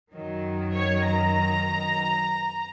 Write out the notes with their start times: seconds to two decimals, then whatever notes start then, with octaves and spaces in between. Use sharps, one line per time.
0.13 F#2 D#3 F#3
0.74 C#5
1.05 A#5